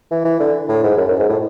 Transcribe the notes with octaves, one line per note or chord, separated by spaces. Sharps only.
E3
E3
D3
A2
G#2
F#2
F#2
G#2
A2